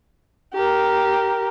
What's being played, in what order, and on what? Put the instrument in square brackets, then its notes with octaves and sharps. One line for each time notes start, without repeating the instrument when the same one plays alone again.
[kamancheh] G4 A#4